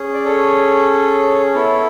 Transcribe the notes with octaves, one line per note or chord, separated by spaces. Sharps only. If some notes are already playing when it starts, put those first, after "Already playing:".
Already playing: C#4 G#4
D5
A4 C#5
B3 E4 A4 C#5